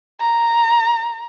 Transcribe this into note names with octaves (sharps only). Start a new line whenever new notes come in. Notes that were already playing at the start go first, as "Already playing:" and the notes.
A#5